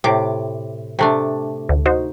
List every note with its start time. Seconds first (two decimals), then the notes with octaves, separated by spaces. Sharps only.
0.04 A2 C3 D6
0.99 C3 A3 D4
1.69 D2
1.86 D#4 F#4 C5